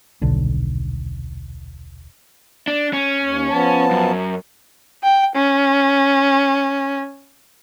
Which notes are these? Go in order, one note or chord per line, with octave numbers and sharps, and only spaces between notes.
D#1 B1 D3
D4
C#4
D#2
F3 B3 A5
F#2
G5
C#4